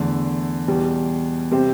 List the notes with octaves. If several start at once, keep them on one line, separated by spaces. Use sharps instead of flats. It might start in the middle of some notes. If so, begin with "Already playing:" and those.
Already playing: E2 D3 A3
E2 B2 G3
C3 G3 C4 G4 C5